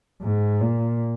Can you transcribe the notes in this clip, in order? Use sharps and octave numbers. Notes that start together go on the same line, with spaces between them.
G#2
A#2